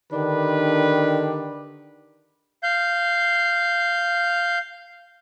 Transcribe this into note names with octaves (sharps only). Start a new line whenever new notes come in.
D3 D#3 D4 G4 B4
F5 G6